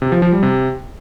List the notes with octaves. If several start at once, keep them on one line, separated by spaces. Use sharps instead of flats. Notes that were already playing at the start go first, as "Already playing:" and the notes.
C3
F3
F3
G3
C3